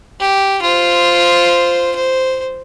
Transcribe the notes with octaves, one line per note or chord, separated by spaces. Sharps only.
G4
F4 C5
C5